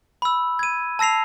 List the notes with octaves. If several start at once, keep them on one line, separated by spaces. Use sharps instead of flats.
B5 E6
G#6 D#7
A5 E6 A#6 C7 F7